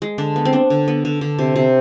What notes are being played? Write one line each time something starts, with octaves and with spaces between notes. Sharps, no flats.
G#3
D3 D4
B3
C4
B3 D4
D3
B3
D3
D3
C3
C3